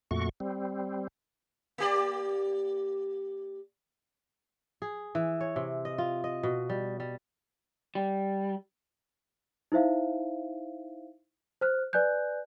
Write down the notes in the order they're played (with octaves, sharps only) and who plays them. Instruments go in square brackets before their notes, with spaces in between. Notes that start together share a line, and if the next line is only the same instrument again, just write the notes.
[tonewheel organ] F2 A#2 A3 F#4 C#6
G3 C4
[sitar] A#3 G4 D5
[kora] G#4
E3
C#5
C3
D#5
F4
D#5
B2
G3
G3
[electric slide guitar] G3
[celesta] D#4 E4 C5 E5 F5
C5 F6 F#6
B4 D5 G#5 F#6 G6